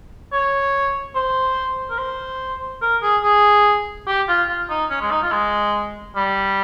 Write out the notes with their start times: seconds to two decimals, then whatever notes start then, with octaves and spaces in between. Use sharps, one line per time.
0.32 C#5
1.15 C5
1.90 A#4
1.98 C5
2.82 A#4
3.03 G#4
3.23 G#4
4.07 G4
4.28 F4
4.49 F4
4.70 D#4
4.90 C#4
5.01 G#3
5.11 D#4
5.22 F4
5.32 G#3
6.16 G3